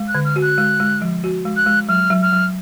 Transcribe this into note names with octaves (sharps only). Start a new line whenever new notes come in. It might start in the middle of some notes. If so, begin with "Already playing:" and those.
Already playing: G#3
F#6
D3
F6
F#4
F#6
G#3
G#3
F3
F#4
G#3
F#6
G#3
F#3 F6
F#3
F6
F#3